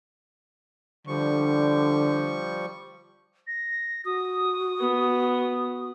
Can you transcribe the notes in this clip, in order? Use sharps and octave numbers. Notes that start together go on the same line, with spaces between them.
D3 F3 G3 C#6
A#6
F#4 D#6
B3